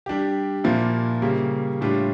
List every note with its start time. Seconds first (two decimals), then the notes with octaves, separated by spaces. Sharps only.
0.06 G3 D4 G4
0.64 A#2 F3 A#3 E4
1.22 C#3 G3 A#3
1.81 A2 G3 D4 F4